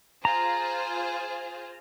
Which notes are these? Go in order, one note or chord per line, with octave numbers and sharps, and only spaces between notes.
F4 G#4 C5 A#5